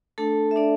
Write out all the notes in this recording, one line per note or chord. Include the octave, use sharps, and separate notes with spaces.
A3 D4 A4 A5
E5
D4 D5